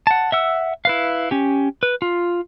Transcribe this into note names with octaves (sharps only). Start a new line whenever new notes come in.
F#5 A5
E5 F#5 E6
E4 B4 F5
C#4 G4
B4
F4